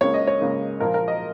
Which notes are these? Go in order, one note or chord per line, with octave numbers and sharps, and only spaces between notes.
C#2 C#3 A#3 C#5
D#5
C#5
C#2 C#3 A#3
A#2 F3 A#3 A#4
A#4
D#5